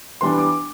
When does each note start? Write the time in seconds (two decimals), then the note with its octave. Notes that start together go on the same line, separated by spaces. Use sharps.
0.21 E3 G3 B3 D4 C6
0.38 D6